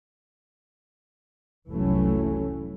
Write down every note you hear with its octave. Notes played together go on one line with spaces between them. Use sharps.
F1 C2 E3 F#3 A3 C#4